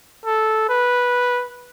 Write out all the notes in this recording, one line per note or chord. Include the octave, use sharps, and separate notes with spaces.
A4
B4